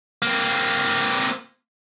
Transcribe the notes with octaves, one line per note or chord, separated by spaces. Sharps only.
A#3 C4